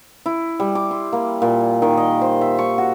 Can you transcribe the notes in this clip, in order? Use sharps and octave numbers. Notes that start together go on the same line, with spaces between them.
E4
G3
D6
C6
A#3
A#2
D#3
D#5
C5
E5
C#6
F#4